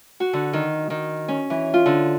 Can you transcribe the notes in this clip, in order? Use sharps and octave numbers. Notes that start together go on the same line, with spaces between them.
F#4
D3
D#3
D#3
C#4
E3
F4
D3